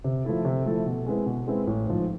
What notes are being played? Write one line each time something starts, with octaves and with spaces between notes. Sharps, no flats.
C3
F3 A3 E4 A4
C3
F3 A3 E4 A4
B2
G#3 C4 E4 B4
B2
G#3 C4 E4 B4
A1
G#2 F3